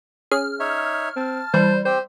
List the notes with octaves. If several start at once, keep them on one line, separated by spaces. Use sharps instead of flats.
C#4 G#4 F6
D#4 C#5 E5
C4 A5
E3 G3 C5
C4 G4 C5